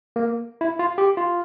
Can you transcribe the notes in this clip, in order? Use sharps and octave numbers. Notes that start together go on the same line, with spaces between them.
A#3
E4
F4
G4
F4